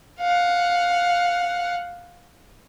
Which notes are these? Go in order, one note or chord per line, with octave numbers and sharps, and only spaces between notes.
F5 F#5